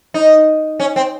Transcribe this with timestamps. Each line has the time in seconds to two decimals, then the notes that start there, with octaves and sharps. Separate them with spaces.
0.14 D#4
0.80 C#4
0.96 C4